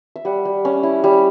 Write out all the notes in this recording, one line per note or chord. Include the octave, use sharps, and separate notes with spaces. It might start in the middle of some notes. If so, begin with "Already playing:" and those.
E5
G3 F#5
G3
C#4
E4
G3